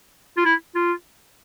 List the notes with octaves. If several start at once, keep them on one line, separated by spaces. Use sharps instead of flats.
F4
E4
F4